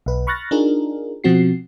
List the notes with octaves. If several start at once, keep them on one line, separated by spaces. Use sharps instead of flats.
B1 B4
B5 C#6 F6 F#6 A6 A#6
D4 D#4 F4 G#4 A#4
B2 F3 C4 F#4 C7